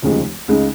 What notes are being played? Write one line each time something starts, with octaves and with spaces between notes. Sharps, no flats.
F1 D#2 C#3 F3 G#3
C#2 C#3 G#3 D#4